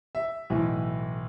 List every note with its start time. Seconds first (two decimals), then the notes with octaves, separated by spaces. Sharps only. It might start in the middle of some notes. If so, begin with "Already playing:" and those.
0.15 E5
0.50 B1 A2 E3